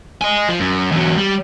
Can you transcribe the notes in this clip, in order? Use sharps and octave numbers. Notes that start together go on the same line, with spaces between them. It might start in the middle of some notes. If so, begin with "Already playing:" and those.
D#5 G#5
F3
F#2
E2 F#3
G3